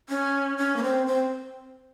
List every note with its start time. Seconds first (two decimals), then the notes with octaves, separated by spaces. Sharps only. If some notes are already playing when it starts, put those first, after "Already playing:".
0.09 C#4
0.58 C#4
0.76 A#3
0.83 C4
1.07 C4